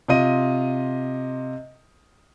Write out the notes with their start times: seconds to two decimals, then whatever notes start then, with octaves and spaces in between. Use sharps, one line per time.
0.08 C3 F4 D#5 D#7